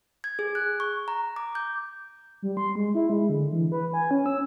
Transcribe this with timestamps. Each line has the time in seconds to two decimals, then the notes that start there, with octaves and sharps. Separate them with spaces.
0.24 G#6
0.39 G#4
0.55 F#6
0.80 C#6
1.08 A#5
1.36 D6
1.55 G6
2.42 G3
2.57 C6
2.75 G#3
2.95 E4
3.10 G#3
3.29 D3
3.51 E3
3.72 B4
3.93 G#5
4.11 C#4
4.26 E6